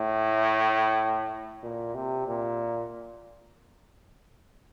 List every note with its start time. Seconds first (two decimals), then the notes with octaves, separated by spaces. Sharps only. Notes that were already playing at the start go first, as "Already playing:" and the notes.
Already playing: A2
1.63 A#2
1.95 C3
2.27 A#2